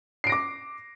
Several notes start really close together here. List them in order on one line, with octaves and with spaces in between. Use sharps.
C7 D7 A#6 D6